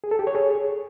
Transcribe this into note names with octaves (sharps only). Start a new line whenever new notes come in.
G#4
A4
G4
C#5
G#4